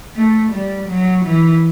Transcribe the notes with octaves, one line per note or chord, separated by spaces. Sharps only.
A3
G3
F#3
E3